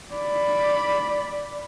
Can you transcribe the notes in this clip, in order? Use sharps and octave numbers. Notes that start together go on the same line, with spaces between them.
D5 B5